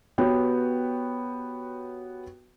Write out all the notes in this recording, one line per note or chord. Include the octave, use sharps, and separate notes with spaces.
B3 F#4 G4 B4 C#5 G5